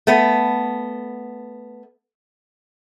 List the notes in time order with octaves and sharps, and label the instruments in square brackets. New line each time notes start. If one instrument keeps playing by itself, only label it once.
[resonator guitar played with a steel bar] A3 B3